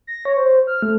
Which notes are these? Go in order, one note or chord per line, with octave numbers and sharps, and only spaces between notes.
A#6
C#5
C5
F6
A3